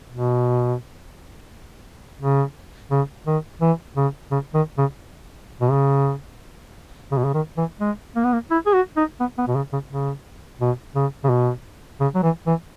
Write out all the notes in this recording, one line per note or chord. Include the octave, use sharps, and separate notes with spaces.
B2
C#3
C#3
D#3
E3
C#3
C#3
D#3
C#3
B2
C#3
C#3
B2
C#3
D#3
E3
G#3
A#3
B3
A#3
E4
G#4
F#4
D#4
B3
B3
B2
C#3
C#3
C#3
B2
C#3
C#3
B2
C#3
F#3
E3
E3